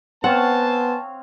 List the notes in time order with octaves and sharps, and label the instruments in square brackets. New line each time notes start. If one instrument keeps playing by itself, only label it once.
[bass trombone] B3 [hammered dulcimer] C4 C#5 F5 [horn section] C5 G#5 A5 [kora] F#5